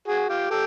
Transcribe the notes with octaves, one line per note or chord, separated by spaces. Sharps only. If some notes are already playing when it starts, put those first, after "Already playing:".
F#4 G#4
F4 G4
G4 A4